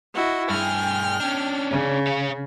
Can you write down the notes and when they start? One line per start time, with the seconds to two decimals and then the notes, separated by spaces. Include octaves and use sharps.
0.13 E4 F#4 D#5
0.50 G2 G#4 G5 F6
1.21 C#4 D4
1.70 C#3
2.07 C#5 F5